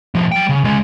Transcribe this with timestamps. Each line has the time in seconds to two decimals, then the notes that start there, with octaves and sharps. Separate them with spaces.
0.15 A2 F3
0.32 F#3 G5
0.49 C#3
0.64 C#2 G#3